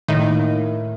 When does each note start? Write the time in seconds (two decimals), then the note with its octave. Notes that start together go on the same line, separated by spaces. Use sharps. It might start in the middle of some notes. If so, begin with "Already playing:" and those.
0.08 A2 D#3
0.28 A#3